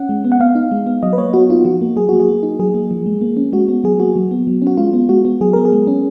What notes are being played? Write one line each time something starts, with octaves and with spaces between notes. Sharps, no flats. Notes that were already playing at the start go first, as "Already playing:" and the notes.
Already playing: C#4 F#5
G#3
B3
F#5
B3 F5
D#4
G#3
B3
F#3 D#5
B4
A#3 C#5
B3 F#4
D#4 F4
F3 F#4
A#3
F#3 G#4
A#3 F#4
G#4
A#3
D#4
F#3 G#4
A#3
F3
G#3
A#3
C#4
G#3 F#4
B3
F#3 G#4
A#3 F#4
F#3
B3
F#3
C#4 F#4
G#3 F4
B3
G#3 F#4
B3
F#3 G#4
B3 A#4
G#4
G#3
C#4